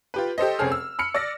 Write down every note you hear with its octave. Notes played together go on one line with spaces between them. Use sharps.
F4 G4 B4
G4 A4 C5 D#5
F1 C4 C#4 G#4 F6
E6
B5 F6 C#7
D5 E6 A#6